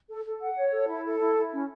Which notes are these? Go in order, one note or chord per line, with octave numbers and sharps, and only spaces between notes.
A4
A4
F#5
C#5
A4
E4
A4
E4
E4
C#4